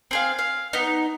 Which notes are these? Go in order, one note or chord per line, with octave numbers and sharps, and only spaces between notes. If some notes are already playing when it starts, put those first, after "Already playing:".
C4 G#4 F5
F5
B3 D#4